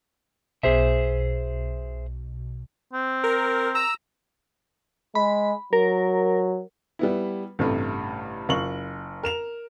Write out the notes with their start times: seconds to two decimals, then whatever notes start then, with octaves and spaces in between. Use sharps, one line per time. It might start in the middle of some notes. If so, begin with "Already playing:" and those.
0.63 B1 B2 G#4 C5 E5
2.93 C4
3.24 A#4
3.75 A#5 E6
5.15 G#3 B5
5.73 F#3 A#4
6.99 G3 B3 E4
7.59 A1 G2 C3 A3
8.49 F#1 F4 C#6 F#7
9.23 A#4 E7 F7